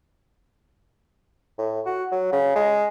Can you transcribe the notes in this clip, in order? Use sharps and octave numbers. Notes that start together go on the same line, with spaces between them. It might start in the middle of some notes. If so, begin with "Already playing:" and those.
A2
F#4
F#3
C#3
G#3